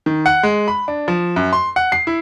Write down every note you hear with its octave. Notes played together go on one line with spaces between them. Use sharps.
D#3
F#5
G#3
B5
D4
F3
F#2
C6
F#5
C7
E4